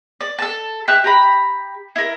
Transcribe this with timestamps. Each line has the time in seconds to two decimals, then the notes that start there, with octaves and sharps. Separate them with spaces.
0.21 D5
0.39 A4 A5
0.88 G4 E5 F#6
1.04 G4 A#5 B5
1.96 E4 A#4